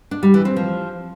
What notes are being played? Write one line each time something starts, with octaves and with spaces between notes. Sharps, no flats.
D4
G3
E3
C4
F3